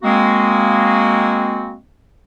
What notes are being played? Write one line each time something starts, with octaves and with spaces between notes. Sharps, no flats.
G#3 A#3 C4 F#4